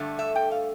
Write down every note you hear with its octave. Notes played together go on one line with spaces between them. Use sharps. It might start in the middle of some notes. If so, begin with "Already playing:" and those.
Already playing: G2 D3 A3
E5
G5
F5